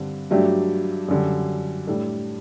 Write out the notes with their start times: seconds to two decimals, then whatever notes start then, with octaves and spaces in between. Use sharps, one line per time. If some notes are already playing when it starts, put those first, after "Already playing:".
Already playing: G2 D3 G3 C4
0.31 G2 F#3 A3 D4 G4
1.08 F#2 D3 G3
1.87 A2 G3 D4 A4